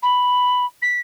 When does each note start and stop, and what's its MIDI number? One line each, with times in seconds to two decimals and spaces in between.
0.02 0.65 83
0.82 1.00 95